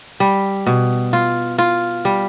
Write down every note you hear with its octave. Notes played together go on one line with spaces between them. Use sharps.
G3
B2
F4
F4
G3